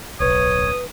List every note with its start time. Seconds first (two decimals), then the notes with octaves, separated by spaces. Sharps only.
0.20 D1 B1 B4 C#5 D#6